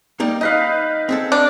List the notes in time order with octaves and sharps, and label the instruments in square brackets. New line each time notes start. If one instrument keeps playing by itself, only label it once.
[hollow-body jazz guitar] G3 A#3 D#4
[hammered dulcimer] D#4 B4 F5 [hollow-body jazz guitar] D#5
[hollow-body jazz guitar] C4 G#4 A4
[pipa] D4